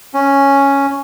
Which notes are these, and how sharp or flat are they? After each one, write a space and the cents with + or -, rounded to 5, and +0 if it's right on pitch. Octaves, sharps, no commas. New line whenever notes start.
C#4 +0